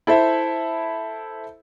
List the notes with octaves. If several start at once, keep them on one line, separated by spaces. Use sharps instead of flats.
E4 A4 C5 E5